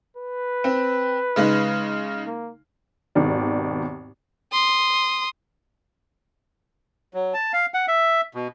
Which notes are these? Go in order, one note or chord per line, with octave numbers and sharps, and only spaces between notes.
B4
C4
C#3 G#3 D#4
A#3
G#1 D#2 B2 D#3 D5
C6 D#6
F#3
A5
F5
F#5
E5
B2